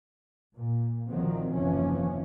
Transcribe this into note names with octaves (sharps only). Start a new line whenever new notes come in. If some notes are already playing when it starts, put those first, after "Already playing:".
A#2
C2 D#3 F3 F#3 C4
F#1 D#2 C3 E3 F3 C#4